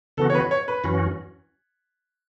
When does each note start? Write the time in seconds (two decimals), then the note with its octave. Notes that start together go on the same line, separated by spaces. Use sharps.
0.17 C#3 E3 B3 F#4 A4
0.30 C#5
0.35 B4
0.51 C#5
0.68 B4
0.84 F#2 E3 C#4 F#4